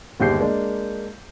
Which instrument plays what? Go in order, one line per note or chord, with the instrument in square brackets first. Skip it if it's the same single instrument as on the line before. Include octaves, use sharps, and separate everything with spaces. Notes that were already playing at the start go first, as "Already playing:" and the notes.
[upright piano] G1 D#2 G#3 G4 G6 C7
G#3 A#3 D4